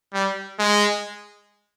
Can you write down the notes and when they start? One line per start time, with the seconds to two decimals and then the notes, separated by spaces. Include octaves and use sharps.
0.14 G3
0.59 G#3